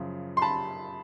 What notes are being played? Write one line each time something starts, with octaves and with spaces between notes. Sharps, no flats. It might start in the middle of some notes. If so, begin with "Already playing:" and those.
Already playing: F#2 C#3 F3
C6
A5 B5